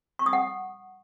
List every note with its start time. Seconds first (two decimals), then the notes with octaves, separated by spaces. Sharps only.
0.19 C#6
0.26 D#6
0.33 F#5